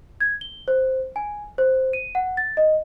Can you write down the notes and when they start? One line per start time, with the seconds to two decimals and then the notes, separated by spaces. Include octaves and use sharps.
0.21 G#6
0.41 G7
0.68 C5
1.16 G#5
1.58 C5
1.93 D#7
2.15 F#5
2.37 A6
2.57 D#5